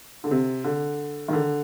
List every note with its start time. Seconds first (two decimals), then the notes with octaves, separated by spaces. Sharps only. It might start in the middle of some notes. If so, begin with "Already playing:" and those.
0.24 D3
0.31 C3
0.64 D3
1.28 D#3
1.33 D3